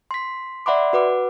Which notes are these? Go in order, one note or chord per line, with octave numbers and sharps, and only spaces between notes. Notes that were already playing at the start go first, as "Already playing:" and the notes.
C6 B6
D5 E5 F#5 B5 C6 D6
F#4 B4 F#5 D6